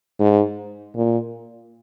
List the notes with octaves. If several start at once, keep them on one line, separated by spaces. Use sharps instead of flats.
G#2
A#2